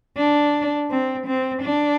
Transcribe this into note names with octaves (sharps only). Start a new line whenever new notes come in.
D4
C4
C4
D4